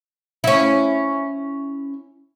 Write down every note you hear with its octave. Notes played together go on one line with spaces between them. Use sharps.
C#4 E4